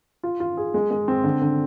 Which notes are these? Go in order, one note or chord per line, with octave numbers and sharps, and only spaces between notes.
F4
F4
G#4
G#3
G#3
C4
D3
D3